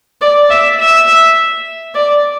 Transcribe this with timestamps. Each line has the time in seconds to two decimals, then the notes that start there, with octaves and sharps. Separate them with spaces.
0.21 D5
0.50 E5
0.79 E5
1.95 D5